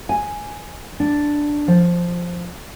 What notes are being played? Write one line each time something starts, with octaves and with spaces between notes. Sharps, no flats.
G#5
D4
F3